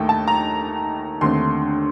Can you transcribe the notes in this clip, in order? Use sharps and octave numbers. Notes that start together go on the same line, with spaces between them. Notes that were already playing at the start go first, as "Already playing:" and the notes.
Already playing: D#2 D#3 A3 G5
A5
A#5
D#2 D3 A3 C4 C6